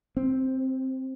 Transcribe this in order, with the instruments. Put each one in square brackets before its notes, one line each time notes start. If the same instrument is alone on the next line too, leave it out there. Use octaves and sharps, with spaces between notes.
[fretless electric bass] C4